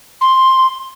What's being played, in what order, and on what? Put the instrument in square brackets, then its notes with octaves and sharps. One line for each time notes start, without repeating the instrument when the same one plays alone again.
[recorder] C6